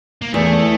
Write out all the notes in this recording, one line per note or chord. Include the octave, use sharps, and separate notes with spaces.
A#3
E2 A3